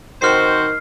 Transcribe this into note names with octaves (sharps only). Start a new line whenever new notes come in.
D#3 C4 F#4 C5 F6 C7